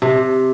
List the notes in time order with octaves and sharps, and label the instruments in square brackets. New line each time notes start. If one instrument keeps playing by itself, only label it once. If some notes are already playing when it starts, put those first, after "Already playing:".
[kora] C3